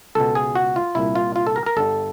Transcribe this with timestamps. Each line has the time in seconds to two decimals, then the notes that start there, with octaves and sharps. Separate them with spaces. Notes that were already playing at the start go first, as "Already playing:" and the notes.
0.15 C#2 B2 A4
0.35 G#4
0.55 F#4
0.76 F4
0.95 C2 A#2 E4
1.15 F4
1.36 F4
1.47 A4
1.56 A#4
1.66 A#4
1.76 G1 G2 D3 A4